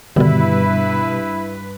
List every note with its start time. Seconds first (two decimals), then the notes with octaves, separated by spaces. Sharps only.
0.16 G2 B2 D3 D#3 G3 E4 B4